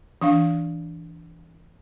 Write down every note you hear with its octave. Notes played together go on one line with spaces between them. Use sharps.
E3 D4 F5